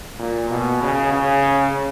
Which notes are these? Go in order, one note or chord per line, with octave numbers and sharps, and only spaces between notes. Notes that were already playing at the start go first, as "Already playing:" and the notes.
A#2
B2
C#3
C#3